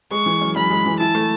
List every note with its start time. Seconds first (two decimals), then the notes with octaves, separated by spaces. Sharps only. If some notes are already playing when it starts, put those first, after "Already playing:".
0.11 G#3 C#6
0.26 E3
0.41 F#2
0.56 F#2 B5
0.70 G#3
0.86 E3
1.00 E4 A5
1.15 A3